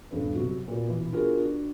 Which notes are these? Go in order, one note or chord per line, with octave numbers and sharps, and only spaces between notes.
D#1 G2 B3
C3 F#3 F#4
A#2 B3 F#4
B2 E3 B3
B3 D4 F4 F#4 G#4 A#4
D4 F#4